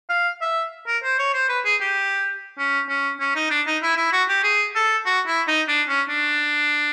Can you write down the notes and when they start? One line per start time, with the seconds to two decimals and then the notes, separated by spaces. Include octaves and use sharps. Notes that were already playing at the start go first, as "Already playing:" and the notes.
0.09 F5
0.41 E5
0.87 A#4
1.03 C5
1.19 C#5
1.34 C5
1.49 B4
1.65 G#4
1.81 G4
2.58 C#4
2.89 C#4
3.20 C#4
3.36 D#4
3.51 D4
3.67 D#4
3.83 E4
3.97 E4
4.12 F#4
4.29 G4
4.44 G#4
4.75 A4
5.06 F#4
5.27 E4
5.47 D#4
5.68 D4
5.88 C#4
6.09 D4